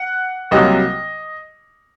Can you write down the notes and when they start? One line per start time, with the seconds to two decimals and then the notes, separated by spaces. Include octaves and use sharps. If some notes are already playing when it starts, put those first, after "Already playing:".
Already playing: F#5
0.51 C2 C3 F#3 A#3 D#5